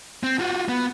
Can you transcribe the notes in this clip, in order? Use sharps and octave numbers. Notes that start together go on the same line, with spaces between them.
C4
F4 F#4
B3